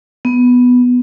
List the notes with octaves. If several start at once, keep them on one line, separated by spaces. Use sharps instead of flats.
B3